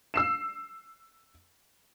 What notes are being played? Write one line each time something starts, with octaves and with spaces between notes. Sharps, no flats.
E6 C7 E7